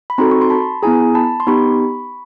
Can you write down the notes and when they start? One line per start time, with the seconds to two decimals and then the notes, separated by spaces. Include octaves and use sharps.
0.10 B5
0.18 C4 D#4 F#4 A4 A#5 C6
0.31 C#6
0.41 C6
0.50 A5 B5
0.83 B3 E4 G#4 G#5 A#5
1.15 A5 B5
1.40 C6
1.47 B3 D#4 G4 B5 C#6